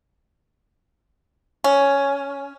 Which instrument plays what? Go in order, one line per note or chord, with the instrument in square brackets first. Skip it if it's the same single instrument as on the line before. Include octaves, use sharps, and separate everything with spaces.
[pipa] C#4